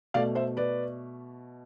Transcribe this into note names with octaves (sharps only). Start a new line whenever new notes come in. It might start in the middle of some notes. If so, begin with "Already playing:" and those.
B2 A3 D5 F5
C5 E5
B4 D5